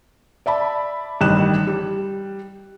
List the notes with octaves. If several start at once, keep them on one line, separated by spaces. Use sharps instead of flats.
D5 E5 A5 B5
A1 G2 D#3 F#6 E7
G3